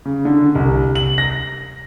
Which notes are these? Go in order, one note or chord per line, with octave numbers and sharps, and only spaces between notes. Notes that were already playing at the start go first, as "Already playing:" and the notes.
C#3
D3
C2
F#7
A#6